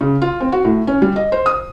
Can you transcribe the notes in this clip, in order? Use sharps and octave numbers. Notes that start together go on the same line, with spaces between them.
C#3
F4
C4
F#4
A2
C#4
G3
D#5
C5
D#6